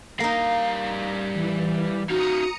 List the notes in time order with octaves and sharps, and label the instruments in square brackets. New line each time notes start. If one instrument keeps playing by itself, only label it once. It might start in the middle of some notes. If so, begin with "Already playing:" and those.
[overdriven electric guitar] G3 F5 [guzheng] A#3 D#4
[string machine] E3
[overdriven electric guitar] D#4 F4 [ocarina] F#4 [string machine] A#5 D#6 C#7